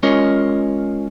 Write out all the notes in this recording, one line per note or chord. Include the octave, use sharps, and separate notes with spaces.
G#3 C#4 F4 A#4 C#5 D#5